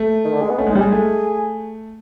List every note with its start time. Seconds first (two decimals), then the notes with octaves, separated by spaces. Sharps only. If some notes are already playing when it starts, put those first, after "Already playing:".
Already playing: A3
0.25 D#3
0.33 D3
0.41 G#3
0.50 B3
0.58 A3 C#4
0.67 G#3
0.70 D#4
0.75 G3 G4
0.80 G#3 G#4
0.92 A3